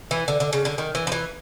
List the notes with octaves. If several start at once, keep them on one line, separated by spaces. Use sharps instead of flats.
E3
D3
D3
C#3
D3
D#3
E3
F3
E3